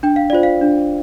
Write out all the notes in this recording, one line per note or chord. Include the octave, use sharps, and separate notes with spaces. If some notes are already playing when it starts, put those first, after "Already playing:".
D4 G5
F5
F4 C5 D5
F5
D4